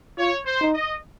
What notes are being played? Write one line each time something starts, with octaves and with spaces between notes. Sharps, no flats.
F4 C#5
C5
D#4
D#5